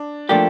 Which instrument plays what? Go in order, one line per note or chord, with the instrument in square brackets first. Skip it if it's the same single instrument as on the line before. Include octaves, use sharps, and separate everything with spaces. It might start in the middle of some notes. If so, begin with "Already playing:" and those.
Already playing: [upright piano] D4
[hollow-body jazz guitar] F3 A3 D4 G4 [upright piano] A#3